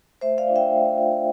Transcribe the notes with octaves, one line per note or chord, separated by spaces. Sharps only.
A3 C5 E5
D5 F5
D4 F4
E5 G5
A3
D4 F4